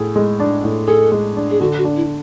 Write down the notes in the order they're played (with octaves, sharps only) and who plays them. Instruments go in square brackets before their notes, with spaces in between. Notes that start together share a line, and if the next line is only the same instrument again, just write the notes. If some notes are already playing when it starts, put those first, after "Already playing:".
Already playing: [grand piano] A2 G#4
G#3
D4
A2
[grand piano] G#4 [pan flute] A4
[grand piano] G#3
D4
[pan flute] G#4
[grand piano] D3 [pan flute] F#4
[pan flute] F#4
[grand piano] D4
[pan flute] E4